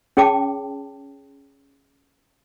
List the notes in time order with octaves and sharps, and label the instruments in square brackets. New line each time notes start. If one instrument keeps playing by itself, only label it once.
[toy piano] C#4 G#4 C#5 G5 A5 D6